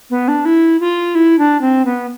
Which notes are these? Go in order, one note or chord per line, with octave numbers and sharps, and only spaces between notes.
B3
D4
E4
F4
E4
D4
C4
B3